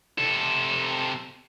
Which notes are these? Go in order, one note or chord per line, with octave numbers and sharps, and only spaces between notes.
C3 A4